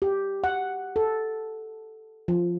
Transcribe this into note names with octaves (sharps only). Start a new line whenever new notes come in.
G4
F#5
A4
F3